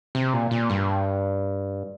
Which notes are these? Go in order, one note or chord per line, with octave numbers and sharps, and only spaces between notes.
C3
A#2
A#2
G2